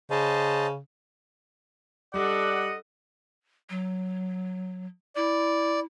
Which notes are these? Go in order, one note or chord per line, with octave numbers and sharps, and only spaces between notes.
C#3 C5 D#5 A5
G3 D4 A4 D5 D#5 F#5
F#3
E4 D5